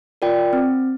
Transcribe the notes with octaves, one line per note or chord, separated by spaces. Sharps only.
F4 A#4 D5 G5
C4